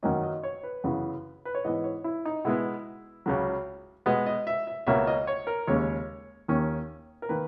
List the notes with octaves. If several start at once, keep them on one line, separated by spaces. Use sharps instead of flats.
F#2 D#3 F#3 A#3 C#4 D#5
D#5
C#5
B4
F#2 C#3 E3 B3
B4
C#5
G#2 E3 B3 D#5
C#5
E4
D#4
B2 G#3 B3 E4
C#2 C#3 F#3
B2 G#3 B3 D#5
D#5
E5
E5
C#2 B2 A#3 C#4 E5
D#5
C#5
A#4
D#2 C#3 G#3 C#4 C#5
D#2 D#3 A#3 C#4
A#4
D#3 A#3 B4